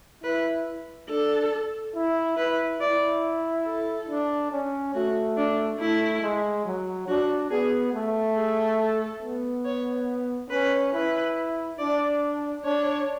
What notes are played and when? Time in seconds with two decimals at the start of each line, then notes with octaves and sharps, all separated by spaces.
0.24 E4 B4
1.09 D4 A4
1.95 E4
2.37 E4 B4
2.80 E4 D5
3.65 A4
4.09 D4
4.51 C#4
4.94 A3 F#4
5.37 D4
5.79 A3 E4
6.22 G#3
6.65 F#3
7.08 D4 F#4
7.50 B3 G#4
7.94 A3
8.36 G#4
8.79 A4
9.23 B3
9.65 C#5
10.50 C#4 B4
10.93 E4 B4
11.78 D4 D5
12.64 D4 C#5